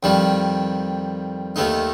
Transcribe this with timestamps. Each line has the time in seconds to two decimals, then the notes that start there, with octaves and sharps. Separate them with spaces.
0.03 F2 D#3 G3
1.56 D#2 D#3 A3 D#4